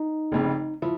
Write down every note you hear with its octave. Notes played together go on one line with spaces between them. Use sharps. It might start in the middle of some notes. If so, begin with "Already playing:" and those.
Already playing: D#4
F1 F2 C#3
F3 E4